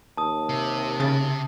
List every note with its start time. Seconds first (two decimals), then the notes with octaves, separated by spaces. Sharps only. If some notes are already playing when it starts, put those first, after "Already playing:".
0.17 D#2 A5 D#6
0.49 C3
1.00 C#3 A6